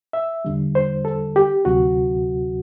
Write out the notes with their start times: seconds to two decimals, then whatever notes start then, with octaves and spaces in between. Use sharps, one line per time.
0.13 E5
0.45 E2 D3 G3
0.75 C5
1.05 A4
1.36 G4
1.65 D2 C3 F#3 F#4